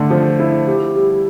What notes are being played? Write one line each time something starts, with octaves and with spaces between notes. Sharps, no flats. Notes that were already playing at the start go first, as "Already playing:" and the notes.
Already playing: D3 A3
F3
E4
G4
G3